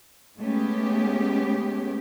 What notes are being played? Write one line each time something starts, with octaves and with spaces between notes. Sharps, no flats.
G#3 A3 B3 C#4 G4